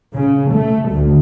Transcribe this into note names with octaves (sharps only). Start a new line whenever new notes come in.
C#3
A3
D2